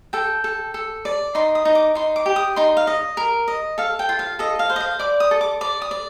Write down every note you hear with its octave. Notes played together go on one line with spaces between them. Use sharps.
A4 G5
A4
A4
D5
D#4 C6
D#6
D#4
D6
D#4 C6
D6
G4
D#6
D#4 C6
F5
D#5
A#4
D#5
A4 F5
G5
F4
F5
A4 D#5
F5
C5
D#5
F5
D5 D6
D#6
A4
D6
D5 D6
D#6
D5